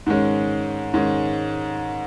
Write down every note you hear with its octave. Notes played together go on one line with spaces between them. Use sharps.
G#2 D#3 G#3 C#4
G#2 D#3 G#3 C#4